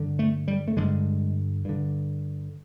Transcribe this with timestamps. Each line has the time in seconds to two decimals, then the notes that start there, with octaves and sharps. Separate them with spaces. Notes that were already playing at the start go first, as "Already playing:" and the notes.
Already playing: G2 D3
0.19 A3
0.48 G3
0.68 A3
0.77 G2 D3 G#3
1.65 G2 D3